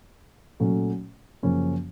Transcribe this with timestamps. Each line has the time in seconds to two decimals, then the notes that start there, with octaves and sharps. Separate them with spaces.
0.60 A#2 F#3 A3 C#4
1.43 F#2 C#3 F3 A#3 C#4